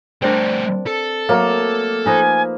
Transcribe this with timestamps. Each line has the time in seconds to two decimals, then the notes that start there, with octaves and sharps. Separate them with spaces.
0.22 G3 A3 C4 D4 A#4
0.87 A4
1.29 F#3 A3 A#3
2.06 F3 D#4 B4 G#5